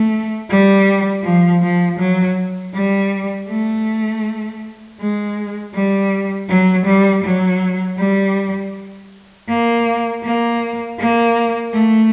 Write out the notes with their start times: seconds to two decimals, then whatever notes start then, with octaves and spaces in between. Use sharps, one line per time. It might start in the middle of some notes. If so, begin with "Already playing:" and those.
Already playing: A3
0.49 G3
1.24 F3
1.62 F3
1.99 F#3
2.74 G3
3.49 A3
4.99 G#3
5.74 G3
6.49 F#3
6.86 G3
7.24 F#3
7.98 G3
9.49 A#3
10.24 A#3
10.99 A#3
11.74 A3